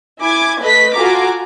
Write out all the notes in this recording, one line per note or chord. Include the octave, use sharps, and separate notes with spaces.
E4 G#5 D6 G#6
A3 B4 D#5 B6
F4 F#4 A4 G#5 A#5 D6